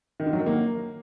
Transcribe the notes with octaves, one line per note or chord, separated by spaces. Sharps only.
D#3
D3
F#3
D#3
A#3